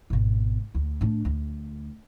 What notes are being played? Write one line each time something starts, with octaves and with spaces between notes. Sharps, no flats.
G#1 B2
D2
A2 D4
D2